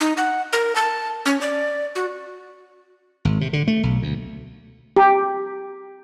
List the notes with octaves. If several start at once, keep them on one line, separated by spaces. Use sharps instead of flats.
D#4
F#5
A#4
A5
C#4
D5
F#4
G#1
C3
D3
A3
B1
D2
G4